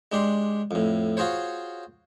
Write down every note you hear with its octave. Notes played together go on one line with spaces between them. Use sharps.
G#3 D4 G4 C6
F2 A2
F4 F#4 G#4 C5 C#5